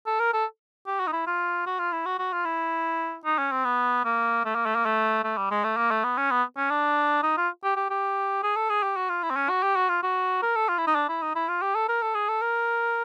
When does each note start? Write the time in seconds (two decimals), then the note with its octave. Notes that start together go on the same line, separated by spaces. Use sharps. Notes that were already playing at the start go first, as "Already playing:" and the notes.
0.06 A4
0.20 A#4
0.33 A4
0.86 G4
1.00 F#4
1.07 D#4
1.13 E4
1.27 F4
1.66 F#4
1.79 F4
1.92 E4
2.06 F#4
2.19 F#4
2.33 F4
2.45 E4
3.25 D#4
3.39 C#4
3.52 C4
3.65 B3
4.05 A#3
4.45 A3
4.55 A#3
4.66 A3
4.75 A#3
4.85 A3
5.24 A3
5.37 G3
5.51 G#3
5.64 A3
5.77 A#3
5.91 A3
6.04 B3
6.18 C#4
6.31 B3
6.57 C#4
6.71 D4
7.23 D#4
7.37 F4
7.64 G4
7.76 G4
7.90 G4
8.43 G#4
8.56 A4
8.70 G#4
8.83 G4
8.96 F#4
9.09 F4
9.23 E4
9.30 C4
9.36 C#4
9.49 F#4
9.63 G4
9.76 F#4
9.89 F4
10.03 F#4
10.42 A#4
10.56 A4
10.69 F4
10.78 E4
10.87 D#4
10.95 D4
11.09 E4
11.22 D#4
11.35 E4
11.49 F4
11.62 G4
11.75 A4
11.89 A#4
12.02 A4
12.15 G#4
12.28 A4
12.42 A#4